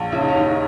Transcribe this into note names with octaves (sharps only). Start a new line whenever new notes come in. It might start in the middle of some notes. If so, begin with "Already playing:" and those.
Already playing: A#1
C#3 E4
D#4
C#4
D#2 D#4